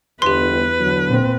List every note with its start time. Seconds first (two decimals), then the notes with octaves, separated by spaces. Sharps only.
0.22 G1 E2 G4 B4 C6
0.80 D3 F#3
1.08 A#2 C4